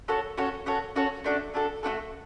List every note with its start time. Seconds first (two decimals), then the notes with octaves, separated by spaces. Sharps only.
0.08 C#4 F#4 A4 C#5
0.37 C#4 F#4 A4 C#5
0.66 C#4 F#4 A4 C#5
0.96 C#4 F#4 A4 C#5
1.24 A3 D4 F#4 A4
1.54 A3 D4 F#4 A4
1.83 A3 D4 F#4 A4